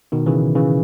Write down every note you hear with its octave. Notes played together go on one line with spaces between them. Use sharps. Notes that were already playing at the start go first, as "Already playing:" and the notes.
B2 D#3
C#3 E3
C#3 E3